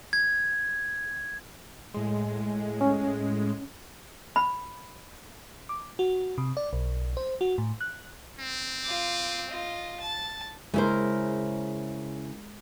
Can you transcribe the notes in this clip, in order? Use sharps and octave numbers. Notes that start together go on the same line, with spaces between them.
G#6
A2 G#3
C#4
B5
D6
F#4
C3
D5
B1
C5
F#4
A2
F#6
C4
F4 D6
F4 D#5
A5
C#3 G#3 E4 A#4 C5